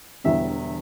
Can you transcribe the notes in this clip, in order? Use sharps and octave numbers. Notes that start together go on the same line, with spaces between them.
E1 E2 D3 G3 E5